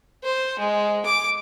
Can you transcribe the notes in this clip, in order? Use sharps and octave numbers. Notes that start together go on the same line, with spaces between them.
C5
G#3
D6